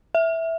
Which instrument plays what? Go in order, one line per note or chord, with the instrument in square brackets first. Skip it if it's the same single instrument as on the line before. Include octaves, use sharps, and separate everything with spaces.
[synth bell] E5